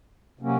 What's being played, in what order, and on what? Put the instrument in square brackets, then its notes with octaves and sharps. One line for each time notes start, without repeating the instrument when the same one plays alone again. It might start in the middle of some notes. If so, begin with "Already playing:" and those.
[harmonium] C3 F#3 A#3 C#4